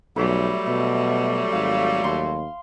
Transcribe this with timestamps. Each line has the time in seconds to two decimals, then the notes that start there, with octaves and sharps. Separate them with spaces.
0.16 B1 F#3 G3 A3 B4 E5
0.66 B2 E5
1.52 G#1 F5
2.04 D#2 C6